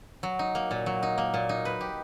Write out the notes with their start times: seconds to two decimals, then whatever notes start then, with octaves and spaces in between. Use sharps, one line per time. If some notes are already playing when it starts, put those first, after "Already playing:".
0.23 F#3
0.39 D#4
0.55 A#3
0.71 A#2
0.86 F#3
1.03 D#4
1.18 A#3
1.34 A#2
1.49 D#4
1.65 B4
1.81 G4